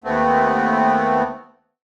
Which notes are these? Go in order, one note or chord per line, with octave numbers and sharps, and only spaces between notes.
D#2 A3 B3 C4